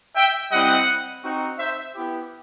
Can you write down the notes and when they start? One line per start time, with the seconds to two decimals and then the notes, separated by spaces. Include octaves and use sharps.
0.16 E5 G5
0.52 G3 C4 E4 D#5 F#5
1.24 C4 D#4 F#4
1.59 C5 E5
1.95 B3 E4 G4